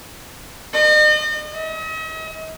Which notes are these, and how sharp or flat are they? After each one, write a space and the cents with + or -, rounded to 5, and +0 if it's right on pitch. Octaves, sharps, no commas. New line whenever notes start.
D#5 -40
D#5 +45